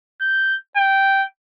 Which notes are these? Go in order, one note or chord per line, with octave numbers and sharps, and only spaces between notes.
G6
G5